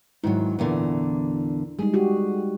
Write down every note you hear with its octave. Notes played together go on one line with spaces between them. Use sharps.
G#2 D#3 F#3 E4
E2 A#2 D3
G3 G#3 D#4 G#4
F#4 G4